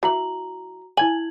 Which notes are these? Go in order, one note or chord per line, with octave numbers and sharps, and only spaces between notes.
E3 F#4 A#5 F#7
E4 G#5 G#6 F#7